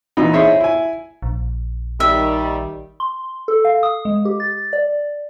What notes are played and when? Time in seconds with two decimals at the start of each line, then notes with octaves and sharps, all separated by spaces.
0.17 A#2 E3 D#4 B5
0.33 D#4 E4 G#4 C5 C#5 E5
0.60 E4 G#5
1.22 A#1
2.00 D#3 G3 E5
3.00 C6
3.48 A4
3.65 F5
3.83 D#6
4.05 G#3
4.25 G4
4.40 A6
4.73 D5